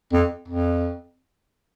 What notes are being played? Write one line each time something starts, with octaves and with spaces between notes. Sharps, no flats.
F2
F2